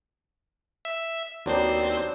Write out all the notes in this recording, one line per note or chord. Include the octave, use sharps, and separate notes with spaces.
E5
D#2 F#3 B3 C4 D4 C5